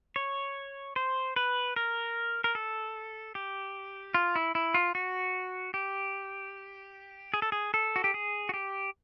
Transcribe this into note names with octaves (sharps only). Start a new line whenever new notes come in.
C#5
C5
B4
A#4
A#4
A4
G4
F4
E4
E4
F4
F#4
G4
G#4
A4
G#4
A4
F#4
G4
G#4
F#4
G4